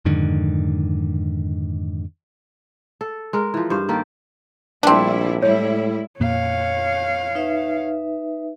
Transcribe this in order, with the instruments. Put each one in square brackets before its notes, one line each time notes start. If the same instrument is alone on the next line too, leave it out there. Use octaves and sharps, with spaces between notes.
[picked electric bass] F2 G#2 D3 D#3
[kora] A4
G#3 A#4
E3 F3
G2 C5 F5
D#3 A#3 G4 A4
[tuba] A#1 [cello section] G3 A3 E4 [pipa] C4 D4
[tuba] A2 [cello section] G3 G#3 E4 [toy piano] C#5
[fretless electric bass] F2 A#2 A#3 [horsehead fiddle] C#5 F5
[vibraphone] D#4 B4 E5